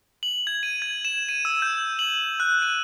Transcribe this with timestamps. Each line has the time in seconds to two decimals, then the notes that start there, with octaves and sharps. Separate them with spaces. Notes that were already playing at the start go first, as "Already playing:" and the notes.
0.23 F#7
0.47 G#6
0.63 D#7
0.82 G#6
1.05 E7
1.29 D#7
1.45 E6
1.62 G6
1.99 F#7
2.40 F#6
2.62 D#7